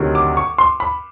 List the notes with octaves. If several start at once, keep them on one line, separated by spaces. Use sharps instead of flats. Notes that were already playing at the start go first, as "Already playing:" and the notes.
Already playing: D2 C3 D#3 F#3
D6
C#6
C6
B5